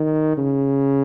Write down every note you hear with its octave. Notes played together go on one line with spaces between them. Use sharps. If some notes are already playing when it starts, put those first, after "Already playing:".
Already playing: D#3
C#3